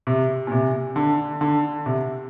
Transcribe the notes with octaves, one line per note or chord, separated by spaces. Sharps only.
C3
A#2
C3
D3
D3
C3